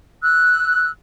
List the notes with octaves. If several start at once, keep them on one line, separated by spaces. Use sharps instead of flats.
E6 F#6